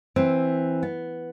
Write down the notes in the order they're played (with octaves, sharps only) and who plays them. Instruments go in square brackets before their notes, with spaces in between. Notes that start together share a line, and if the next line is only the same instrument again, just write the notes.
[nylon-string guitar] E3 C4
B3